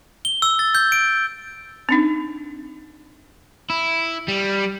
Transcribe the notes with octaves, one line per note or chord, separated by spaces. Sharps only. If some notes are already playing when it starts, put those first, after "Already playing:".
G7
E6
A6
G6
D7
C4 D4 D#4
E4
G3